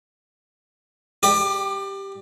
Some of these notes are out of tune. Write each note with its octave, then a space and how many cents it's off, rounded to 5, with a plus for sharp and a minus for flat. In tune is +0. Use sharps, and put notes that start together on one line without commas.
G4 +0 D5 +30